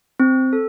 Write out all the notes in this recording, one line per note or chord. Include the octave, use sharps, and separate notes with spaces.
C4
A4